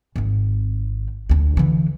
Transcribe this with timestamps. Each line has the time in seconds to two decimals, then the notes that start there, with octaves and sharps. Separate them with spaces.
0.16 G#1 C4
1.29 D2 D4
1.57 D3 E3